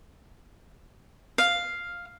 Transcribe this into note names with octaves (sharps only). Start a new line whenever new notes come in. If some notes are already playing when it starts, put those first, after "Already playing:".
F5